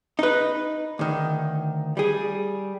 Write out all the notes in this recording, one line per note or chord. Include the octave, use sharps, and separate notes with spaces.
D#4 B4
D2 D#3
G3 G#4